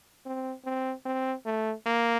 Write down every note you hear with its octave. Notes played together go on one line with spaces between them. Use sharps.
C4
C4
C4
A3
A#3